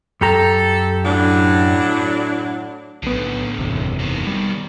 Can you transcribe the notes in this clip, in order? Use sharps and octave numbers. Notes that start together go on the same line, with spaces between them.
F#2 G4 A4 A#5
A2 F#3 D4
B1 A2 D3 B3
F#1 E2 C3
B2 D#3
G3